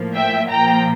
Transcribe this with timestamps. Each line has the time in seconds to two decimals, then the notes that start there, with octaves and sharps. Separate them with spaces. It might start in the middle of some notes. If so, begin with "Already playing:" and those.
Already playing: A2 F3 A#3
0.15 E5 G5
0.50 A#2 F3 A#3 G5 A#5